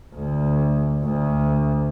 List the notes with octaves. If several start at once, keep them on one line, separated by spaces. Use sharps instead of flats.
D2
D2